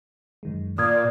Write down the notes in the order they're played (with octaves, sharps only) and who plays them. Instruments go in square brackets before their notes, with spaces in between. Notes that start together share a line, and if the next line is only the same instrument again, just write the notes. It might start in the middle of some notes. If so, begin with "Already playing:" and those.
[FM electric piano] F#2 D#3 G#3
[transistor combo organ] A#2 [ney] D5 [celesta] D#6 G#6 [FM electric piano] F6